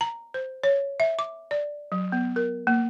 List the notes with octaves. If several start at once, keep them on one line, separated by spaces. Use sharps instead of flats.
A#5
C5
C#5
E5
D6
D5
F#3
B3
A#4
A#3